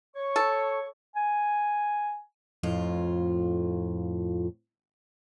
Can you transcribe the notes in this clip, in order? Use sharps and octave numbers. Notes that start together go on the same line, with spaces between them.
C#5 C#6
A4
G#5
F2 A2 F4